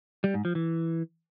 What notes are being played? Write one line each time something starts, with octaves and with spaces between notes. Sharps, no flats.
G3
G#2
F3
E3